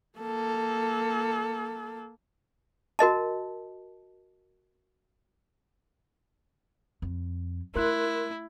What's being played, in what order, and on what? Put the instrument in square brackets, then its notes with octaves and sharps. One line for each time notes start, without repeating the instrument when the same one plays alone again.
[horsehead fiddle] A#3 A4
[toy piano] F#4 A#4 D#5 A5
[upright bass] F2
[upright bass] A3 [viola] E4 [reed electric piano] A#4 C6 F#6